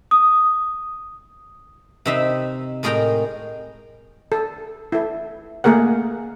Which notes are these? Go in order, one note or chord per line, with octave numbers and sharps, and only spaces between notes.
D#6
C3 C4 D#4 E5 B5
A2 G#3 G#4 A#4 G5 A#5
A4
E4 A4
A3 A#3 G#4 A#4 F#5